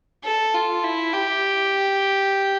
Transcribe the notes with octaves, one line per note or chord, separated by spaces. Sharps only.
A4
F4
E4
G4